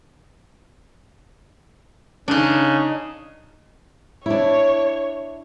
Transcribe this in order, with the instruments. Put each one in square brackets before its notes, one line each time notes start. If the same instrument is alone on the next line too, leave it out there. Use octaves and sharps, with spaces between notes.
[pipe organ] C#3 [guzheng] D4 D#4
[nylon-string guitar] D4 E4 [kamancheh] C#5